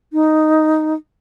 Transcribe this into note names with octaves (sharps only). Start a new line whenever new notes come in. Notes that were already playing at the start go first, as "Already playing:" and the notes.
D#4